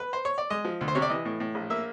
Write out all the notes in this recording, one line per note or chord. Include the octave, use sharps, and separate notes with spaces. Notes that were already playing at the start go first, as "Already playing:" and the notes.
B4
C5
C#5
D5
G#3 D#5
F3
D2
C5
C3 C#5
D5
E3 D#5
A2
A2
A#1
A#3 E5